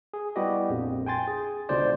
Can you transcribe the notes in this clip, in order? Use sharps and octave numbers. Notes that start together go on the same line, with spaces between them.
G#4
G3 B3 E4 F#4 G4 D#5
A#1 F2
G5 G#5 C6 A6
G#4
C#2 B2 D3 C5 D5